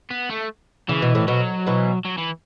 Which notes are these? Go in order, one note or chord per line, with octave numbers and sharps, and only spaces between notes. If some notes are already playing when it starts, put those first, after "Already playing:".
B3
A3
C#3 E3
B2
A2
B2 F#3
B2 E3
F#3
E3